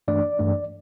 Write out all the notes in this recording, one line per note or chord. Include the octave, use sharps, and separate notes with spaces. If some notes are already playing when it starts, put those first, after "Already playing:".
G2 E3 A3 D4 D5
G2 E3 A3 D4